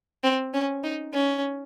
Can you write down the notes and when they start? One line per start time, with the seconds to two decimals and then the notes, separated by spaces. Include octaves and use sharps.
0.24 C4
0.54 C#4
0.84 D#4
1.13 C#4